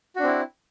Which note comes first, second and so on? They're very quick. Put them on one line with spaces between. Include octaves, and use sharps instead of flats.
F#4 D4 C4 E4